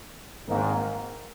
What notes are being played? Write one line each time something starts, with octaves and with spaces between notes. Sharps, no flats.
G#1 G#2 D#3 A#3